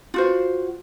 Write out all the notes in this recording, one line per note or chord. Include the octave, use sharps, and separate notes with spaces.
F4 F#4 C5